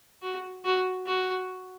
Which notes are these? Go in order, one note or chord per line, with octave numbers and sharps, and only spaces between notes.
F#4
F#4
F#4